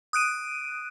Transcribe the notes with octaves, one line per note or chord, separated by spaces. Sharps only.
D#6 F#6 D7 D#7